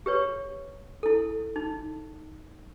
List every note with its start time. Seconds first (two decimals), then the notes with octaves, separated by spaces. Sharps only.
0.06 G4 B4 C#5
1.03 E4 A4
1.56 D#4